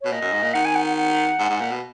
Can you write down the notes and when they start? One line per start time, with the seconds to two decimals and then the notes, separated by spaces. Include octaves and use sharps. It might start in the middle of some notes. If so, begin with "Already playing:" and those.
0.01 B2 C#5
0.12 A#2 D#5
0.22 F#2
0.33 G#2
0.43 A#2
0.54 D#3 F#5
0.65 G#5
0.75 F#5
0.86 F#5
0.97 F#5
1.40 G#2
1.50 G#2
1.61 A#2
1.71 B2